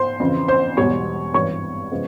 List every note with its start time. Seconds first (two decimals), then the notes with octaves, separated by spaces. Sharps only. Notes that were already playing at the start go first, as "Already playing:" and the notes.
Already playing: C5 C6
0.20 F2 C#3 E3
0.48 C5 C6
0.77 E1 E2 B2 G3 C#5 C#6
1.34 G#1 G2 E3 C#5 C#6
1.91 C#3 F3 G#3 B3